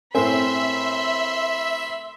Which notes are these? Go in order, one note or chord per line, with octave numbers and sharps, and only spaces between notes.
A2 C4 A#4 C5 E5 G#5 B5 C6